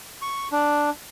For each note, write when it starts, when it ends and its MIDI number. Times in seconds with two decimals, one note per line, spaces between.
0.22 0.48 85
0.52 0.90 62